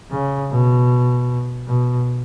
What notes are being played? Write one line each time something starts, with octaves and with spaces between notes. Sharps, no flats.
C#3
B2
B2